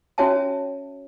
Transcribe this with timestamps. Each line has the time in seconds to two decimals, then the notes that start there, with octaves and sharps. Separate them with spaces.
0.18 C#4 F#4 C#5 E5 G5 A5